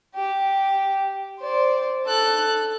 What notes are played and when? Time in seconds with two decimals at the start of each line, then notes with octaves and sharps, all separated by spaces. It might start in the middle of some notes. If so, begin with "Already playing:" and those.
0.15 G4
1.39 C5 D5
2.06 A4 F#6